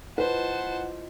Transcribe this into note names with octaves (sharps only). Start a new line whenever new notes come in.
E4 F4 B4 C5 D#5 F#5 A5